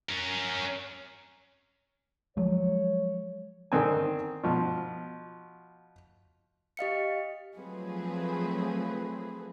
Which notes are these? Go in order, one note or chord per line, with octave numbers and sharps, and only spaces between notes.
C#4 A#4
F3 F#3 G#3 C#5
D3 D#3 C4 G#5
B2 F3
G4 D#5 F5 C#7
F3 F#3 A3 C4 G#4 B4